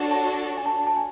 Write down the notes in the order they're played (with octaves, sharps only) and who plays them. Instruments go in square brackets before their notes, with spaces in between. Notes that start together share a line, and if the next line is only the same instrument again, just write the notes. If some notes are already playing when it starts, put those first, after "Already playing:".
Already playing: [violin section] D4 F#4 A4 C#5
[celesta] A5
G#5
A5
A5
G#5